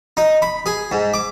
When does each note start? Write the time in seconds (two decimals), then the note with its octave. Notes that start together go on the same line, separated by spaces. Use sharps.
0.17 D#4
0.42 B5
0.66 G#4
0.92 G#2
1.14 D6